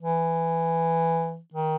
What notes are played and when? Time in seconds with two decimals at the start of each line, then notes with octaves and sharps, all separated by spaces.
0.02 E3
1.53 D#3